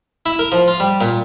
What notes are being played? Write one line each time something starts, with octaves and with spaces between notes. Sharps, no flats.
E4
A#4
F3
F4
G3
A#2